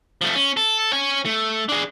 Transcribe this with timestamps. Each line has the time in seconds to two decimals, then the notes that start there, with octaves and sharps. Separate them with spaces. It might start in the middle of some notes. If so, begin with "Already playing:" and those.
0.21 F3 A3
0.35 C#4
0.57 A4
0.92 C#5 G#5
1.25 A3
1.69 D4 G#4